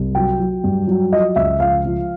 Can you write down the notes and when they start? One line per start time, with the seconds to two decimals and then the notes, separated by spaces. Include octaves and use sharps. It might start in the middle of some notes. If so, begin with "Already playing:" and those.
Already playing: C2
0.15 F#3 G5
0.40 F#3
0.64 G2
0.87 F#3
1.13 F3 D#5
1.36 C#2 E5
1.60 F3 F5
1.85 F3